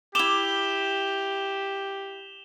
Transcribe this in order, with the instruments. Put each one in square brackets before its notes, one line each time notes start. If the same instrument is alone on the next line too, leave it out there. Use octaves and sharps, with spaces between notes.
[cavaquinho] E4 D6 [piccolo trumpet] G4 [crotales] E7 F7 G7